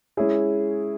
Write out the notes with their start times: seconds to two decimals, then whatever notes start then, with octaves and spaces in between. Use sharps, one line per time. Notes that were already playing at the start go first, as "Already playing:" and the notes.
0.17 G#3 C#4 E4 G#4